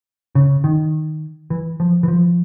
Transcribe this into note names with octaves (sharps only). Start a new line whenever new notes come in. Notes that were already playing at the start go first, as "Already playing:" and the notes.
C#3
D#3
E3
F3
E3
F3